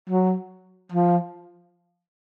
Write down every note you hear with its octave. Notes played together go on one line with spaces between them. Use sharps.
F#3
F3